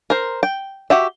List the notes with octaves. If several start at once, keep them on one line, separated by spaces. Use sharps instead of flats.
A#4 C5
G5
F#4 G4 E5